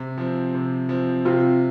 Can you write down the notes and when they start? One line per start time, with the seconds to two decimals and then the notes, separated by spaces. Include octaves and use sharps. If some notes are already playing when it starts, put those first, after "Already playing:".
Already playing: C3
0.18 F3 C4
0.54 C3
0.89 F3 C4
1.25 C3 C4 F4